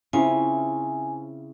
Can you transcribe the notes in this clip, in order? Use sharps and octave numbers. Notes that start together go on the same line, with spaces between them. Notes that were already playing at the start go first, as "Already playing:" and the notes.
C#3 C4 C#4 E4 F4 G#5